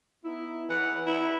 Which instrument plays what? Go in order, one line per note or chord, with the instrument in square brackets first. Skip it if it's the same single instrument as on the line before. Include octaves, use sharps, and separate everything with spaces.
[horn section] B3 D#4 E4
[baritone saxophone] E3 [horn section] F#5
[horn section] E3 [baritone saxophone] E4